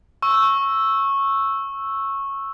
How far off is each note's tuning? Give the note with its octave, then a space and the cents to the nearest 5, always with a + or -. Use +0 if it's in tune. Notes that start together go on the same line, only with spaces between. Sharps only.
C#6 -15 E6 +0